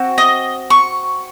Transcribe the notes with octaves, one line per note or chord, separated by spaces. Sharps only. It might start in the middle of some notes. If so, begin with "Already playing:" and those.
Already playing: C4 F#4
D#5
C#6